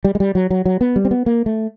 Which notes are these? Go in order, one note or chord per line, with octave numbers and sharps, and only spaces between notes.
G3
G#3
G3
F#3
F#3
F#3
B3
G3
C4
B3
A#3
A3